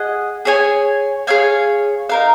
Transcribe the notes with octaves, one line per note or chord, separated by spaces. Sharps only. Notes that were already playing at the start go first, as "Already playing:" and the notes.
Already playing: G#4 D#5 F#5
G#4 C#5 G#5
G#4 C#5 F5 G#5
D#4 A#4 F5